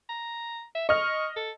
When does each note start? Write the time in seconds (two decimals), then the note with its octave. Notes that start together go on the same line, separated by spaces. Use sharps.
0.09 A#5
0.75 E5
0.89 D#5 C#6 F6
1.36 A4